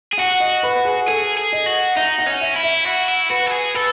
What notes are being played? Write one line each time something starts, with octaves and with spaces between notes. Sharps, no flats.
G#4
F#4 F#5
D#5
B4
G#4
G#4 A4
G#4
D#5
F#4
D#4 E5
F#5
C#4
E5
E4
E5
F#4
E4
F#4 B4
A4
G#4
A4 B4